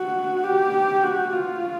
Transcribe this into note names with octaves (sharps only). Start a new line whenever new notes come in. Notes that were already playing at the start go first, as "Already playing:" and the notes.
Already playing: F#4
G4
F#4
F4